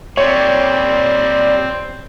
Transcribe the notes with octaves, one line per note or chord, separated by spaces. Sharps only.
A#2 G3 C4 C#5 D5